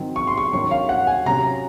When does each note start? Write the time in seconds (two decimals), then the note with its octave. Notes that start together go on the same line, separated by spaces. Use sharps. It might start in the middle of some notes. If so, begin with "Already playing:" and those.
Already playing: D#3 F#3 C4 D#4
0.16 C#6
0.27 C6
0.38 C#6
0.53 D#3 F#3 C#4 C#6
0.71 F5
0.89 F#5
1.07 G#5
1.26 C3 F#3 C#4 A#5